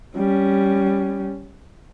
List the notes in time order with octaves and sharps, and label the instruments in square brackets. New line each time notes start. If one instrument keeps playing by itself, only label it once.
[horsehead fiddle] G3 C#4